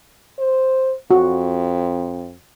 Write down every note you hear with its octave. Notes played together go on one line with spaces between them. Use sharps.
C5
F2 F#4